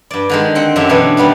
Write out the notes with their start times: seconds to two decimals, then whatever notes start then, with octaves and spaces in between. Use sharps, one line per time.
0.11 G2 D5
0.30 D3 D#3 G#3
0.55 C4 F#5 G5
0.76 F#2 D3 G4 E5
0.89 B2 E3 C#4 D4
1.17 D#3 G3 B3 D4